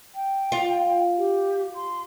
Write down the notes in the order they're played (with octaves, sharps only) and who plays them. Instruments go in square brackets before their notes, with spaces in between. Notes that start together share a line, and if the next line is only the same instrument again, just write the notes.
[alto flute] G5
[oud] F4
[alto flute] G4
C6